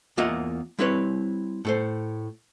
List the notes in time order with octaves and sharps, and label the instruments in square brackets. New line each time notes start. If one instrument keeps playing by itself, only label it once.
[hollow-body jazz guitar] E2 A#3 F4 D#5 E5 F#5
G3 C4 E4 B4 C#5
A2 A4 C5